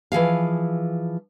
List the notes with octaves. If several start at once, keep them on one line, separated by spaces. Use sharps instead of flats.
E3 F3 G#4 F5